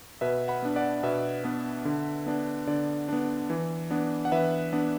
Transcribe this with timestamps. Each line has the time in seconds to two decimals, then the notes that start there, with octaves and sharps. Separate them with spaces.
0.21 B2 B4 E5
0.48 F#5 B5
0.63 B3 D4
0.76 D5 F#5
1.03 B2 B4 E5
1.44 B3 D4
1.85 D3
2.26 B3 D4
2.67 D3 D5
3.09 B3 D4
3.50 E3
3.91 B3 D4
4.25 F#5
4.32 E3 B4 E5
4.73 B3 D4